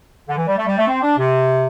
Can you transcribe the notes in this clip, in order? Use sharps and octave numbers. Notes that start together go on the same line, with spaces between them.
D3
E3
G3
A3
G3
A3
C4
D4
C3